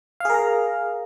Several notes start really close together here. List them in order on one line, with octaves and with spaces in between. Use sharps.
F5 G#4 A#4 A#5